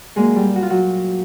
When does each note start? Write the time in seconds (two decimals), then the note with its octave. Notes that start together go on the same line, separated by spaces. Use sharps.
0.16 A#2 F#3 G#3 A#3 G#4
0.36 G3 G4
0.56 F#4
0.62 F4
0.70 F#3 F#4